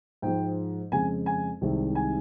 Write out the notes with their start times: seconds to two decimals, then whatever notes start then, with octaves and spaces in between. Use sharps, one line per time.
0.22 G#2 F3 G#3 G5
0.92 F2 C#3 G#3 G#5
1.26 G#5
1.61 C2 C3 D#3 G#3
1.95 G#5